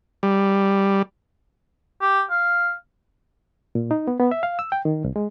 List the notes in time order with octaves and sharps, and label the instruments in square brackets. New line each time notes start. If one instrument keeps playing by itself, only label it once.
[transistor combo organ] G3
[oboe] G4
F5
[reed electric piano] A#2
D#4
B3
B3
E5
F5
E6
G5
D#3
C2
G#3